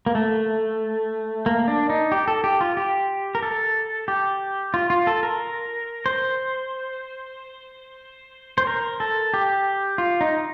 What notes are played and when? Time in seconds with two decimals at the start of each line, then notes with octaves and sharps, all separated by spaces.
0.06 A#3
0.15 A3
1.46 A#3
1.68 D4
1.90 D#4
2.12 G4
2.28 A4
2.44 G4
2.61 F4
2.77 G4
3.35 A#4
3.43 A4
4.08 G4
4.74 F4
4.90 F4
5.07 A4
5.23 A#4
6.06 C5
8.58 C5
8.67 A#4
9.00 A4
9.34 G4
9.98 F4
10.21 D#4